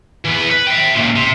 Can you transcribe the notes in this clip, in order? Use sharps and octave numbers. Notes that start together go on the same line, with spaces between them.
E3 B3
B4
E5 G5
C#2 A#2
C3